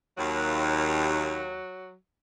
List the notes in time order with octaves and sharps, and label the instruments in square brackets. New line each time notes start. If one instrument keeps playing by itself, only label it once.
[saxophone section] D#2 [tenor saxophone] F#3